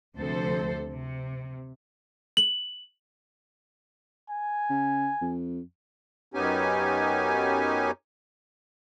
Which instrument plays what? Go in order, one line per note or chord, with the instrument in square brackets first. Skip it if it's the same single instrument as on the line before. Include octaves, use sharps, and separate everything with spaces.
[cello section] D2 C3 F3 A4 C5
C3
[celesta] F#7
[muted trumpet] G#5
[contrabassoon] C#3
F2
[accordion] F#2 B3 C#4 D#4 G4 G#5